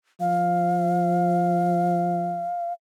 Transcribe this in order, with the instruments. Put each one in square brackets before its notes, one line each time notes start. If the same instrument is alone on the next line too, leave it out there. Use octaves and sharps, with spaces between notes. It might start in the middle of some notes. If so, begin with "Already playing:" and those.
[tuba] F3 [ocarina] F5